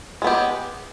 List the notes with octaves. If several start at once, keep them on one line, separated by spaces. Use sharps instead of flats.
G#3 B3 G4